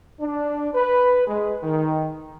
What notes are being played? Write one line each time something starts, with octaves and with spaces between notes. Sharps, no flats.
D4
B4
G#3
D#3